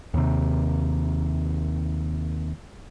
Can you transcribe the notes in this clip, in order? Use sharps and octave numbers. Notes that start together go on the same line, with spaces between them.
D#2 C3